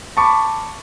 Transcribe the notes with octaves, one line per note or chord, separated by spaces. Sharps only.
A5 B5 C#6 D6